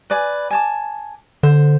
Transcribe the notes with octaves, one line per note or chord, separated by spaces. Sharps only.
B4 D5 G#5
G#5 A5 D6
D3 C5